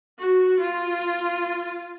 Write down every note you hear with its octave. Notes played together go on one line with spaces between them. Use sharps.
F#4
F4